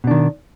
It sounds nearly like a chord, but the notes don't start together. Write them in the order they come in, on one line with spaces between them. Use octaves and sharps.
B2 D4 D#3